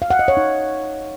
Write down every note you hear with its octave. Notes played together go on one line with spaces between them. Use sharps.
F5
F#5
D#5
C#5
D#4